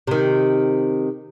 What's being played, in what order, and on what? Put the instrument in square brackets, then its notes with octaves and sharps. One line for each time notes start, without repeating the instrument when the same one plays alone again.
[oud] C3 D#3